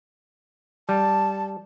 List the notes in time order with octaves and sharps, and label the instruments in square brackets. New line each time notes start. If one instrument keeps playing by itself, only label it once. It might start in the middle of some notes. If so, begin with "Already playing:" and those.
[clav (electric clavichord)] G3 [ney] A5